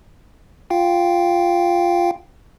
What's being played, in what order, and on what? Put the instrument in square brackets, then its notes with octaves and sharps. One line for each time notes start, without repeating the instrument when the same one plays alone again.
[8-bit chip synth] F4 F5 G5